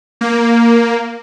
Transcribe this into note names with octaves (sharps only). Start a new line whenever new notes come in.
A#3